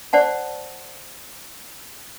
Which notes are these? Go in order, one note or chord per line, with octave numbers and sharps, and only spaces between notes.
C5 D5 F#5 A5